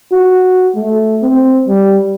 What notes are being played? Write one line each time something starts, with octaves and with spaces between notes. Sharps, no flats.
F#4
A3
C4
G3